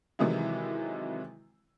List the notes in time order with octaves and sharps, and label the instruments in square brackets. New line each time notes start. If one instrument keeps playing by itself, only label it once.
[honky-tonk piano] C3 D#3 E3 F#3 G#3 E4